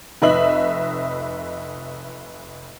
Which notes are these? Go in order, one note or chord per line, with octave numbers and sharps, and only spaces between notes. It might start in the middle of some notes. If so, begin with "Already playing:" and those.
F1 B4 D#5 E5 F#7